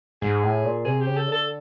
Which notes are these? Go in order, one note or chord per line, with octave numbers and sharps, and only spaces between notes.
G#2 G#4
A2
A#2
C3 G#4
G4
C#3
A4
D3 A4